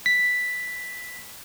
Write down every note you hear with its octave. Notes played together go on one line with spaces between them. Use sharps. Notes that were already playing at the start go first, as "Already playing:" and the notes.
B6